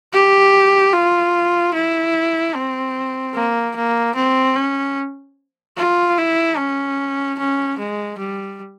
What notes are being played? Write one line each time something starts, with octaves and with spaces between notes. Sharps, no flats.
G4
F4
E4
C4
A#3
A#3
C4
C#4
F4
E4
C#4
C#4
G#3
G3